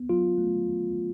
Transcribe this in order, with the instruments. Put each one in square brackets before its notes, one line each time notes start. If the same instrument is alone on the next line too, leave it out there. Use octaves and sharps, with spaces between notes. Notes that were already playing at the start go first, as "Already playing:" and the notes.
Already playing: [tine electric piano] B3
F#3 F4
A3